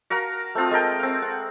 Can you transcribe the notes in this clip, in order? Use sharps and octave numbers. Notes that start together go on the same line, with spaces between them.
F#4 A#4 F5 A#5
A3 C4 F4 D#6
G#3 A3 A#4 G5
C4 F5
F#5